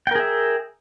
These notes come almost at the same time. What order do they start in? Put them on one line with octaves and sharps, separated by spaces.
G5 A#4 G#4 E5